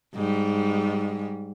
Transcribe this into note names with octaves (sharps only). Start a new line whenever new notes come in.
G#2 G3